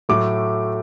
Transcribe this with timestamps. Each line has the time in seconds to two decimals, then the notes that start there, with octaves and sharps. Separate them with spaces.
0.09 A2 F#3 A3 D6